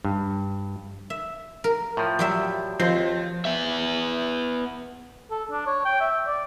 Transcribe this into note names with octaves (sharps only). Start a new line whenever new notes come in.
G2
E5
A#4
A2 F3
F#3 G3 E5
D#2 F3 C4 C5
B3 E5
A4
D4
C#5
G5
E5
D5